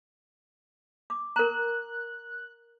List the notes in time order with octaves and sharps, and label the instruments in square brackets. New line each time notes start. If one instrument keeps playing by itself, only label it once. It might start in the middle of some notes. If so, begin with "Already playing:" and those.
[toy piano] D6
[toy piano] A#4 A#5 [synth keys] F#6